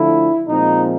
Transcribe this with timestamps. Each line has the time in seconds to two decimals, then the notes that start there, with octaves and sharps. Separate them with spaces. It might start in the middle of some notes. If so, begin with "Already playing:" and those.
Already playing: D3 F3 A3 E4
0.48 A#2 F3 G#3 C4 D#4